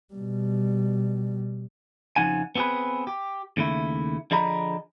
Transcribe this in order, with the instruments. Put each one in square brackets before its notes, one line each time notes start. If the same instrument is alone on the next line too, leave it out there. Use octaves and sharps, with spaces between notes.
[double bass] B2 G3
[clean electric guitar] F2 C#3 F3 D#4 F#5 G#5
B3 C4 G4 G#4 B4
G4
D#2 C#3 A3 E4
D3 F3 G#4 D#5 A#5 B5